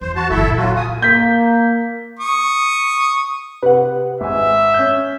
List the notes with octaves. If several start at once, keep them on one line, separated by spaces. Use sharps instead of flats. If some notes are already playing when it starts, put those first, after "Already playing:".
E2 C5
F#4 A5
F#1 D3 E4 A4 E5
A#2
F#3 F4 F#4
C3 G#5 D#6
A#3 G6 B6
C#6 D#6
C3 B4 F#5
G#1 E5 G#5
C#4 G6